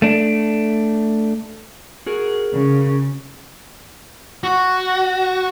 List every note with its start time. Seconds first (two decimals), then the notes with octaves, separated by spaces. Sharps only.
0.02 A3 D4
2.06 F#4 G#4 A#4
2.52 C#3
4.44 F#4